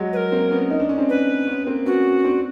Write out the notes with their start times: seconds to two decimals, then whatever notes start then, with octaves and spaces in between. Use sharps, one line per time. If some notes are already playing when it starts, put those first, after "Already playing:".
Already playing: F#3 G#3
0.13 B4
0.16 A#4
0.32 A#3 C4
0.51 B3 C#4
0.70 D#4
0.80 D4
0.89 C#4
0.98 C4 D4
1.09 B4
1.47 B3 C#4
1.67 A#3 C4
1.85 B3 C#4 F#4
2.24 C4 D4